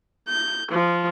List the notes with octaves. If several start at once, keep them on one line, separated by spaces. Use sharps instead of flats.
G6
F3